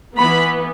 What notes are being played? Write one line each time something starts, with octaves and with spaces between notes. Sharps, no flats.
E3 B3 B5